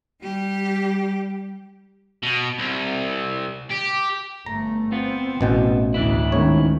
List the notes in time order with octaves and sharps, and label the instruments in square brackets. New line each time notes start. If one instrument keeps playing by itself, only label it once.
[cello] G3 G4
[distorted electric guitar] B2
C2
G4
[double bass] G1 A3 [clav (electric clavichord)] A#5
[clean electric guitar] B3 F4 [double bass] C4
[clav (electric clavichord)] A1 B2 G5
[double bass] D2 A2 [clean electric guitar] E3 D4 E4
[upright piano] C#2 G#2 D#3 [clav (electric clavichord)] C#5